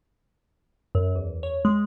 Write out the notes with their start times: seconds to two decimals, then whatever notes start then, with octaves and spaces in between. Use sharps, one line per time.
0.95 F#2
1.15 E2
1.43 C#5
1.65 G#3